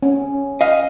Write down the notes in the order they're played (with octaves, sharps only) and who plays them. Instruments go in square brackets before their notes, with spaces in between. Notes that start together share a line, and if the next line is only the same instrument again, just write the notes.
[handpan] C#4
[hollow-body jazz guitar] D#5 F5